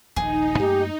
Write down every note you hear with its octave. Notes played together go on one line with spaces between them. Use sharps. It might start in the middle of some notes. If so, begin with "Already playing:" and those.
D#1 A#1 D#4 G#4
F#2 A3 A#3 G4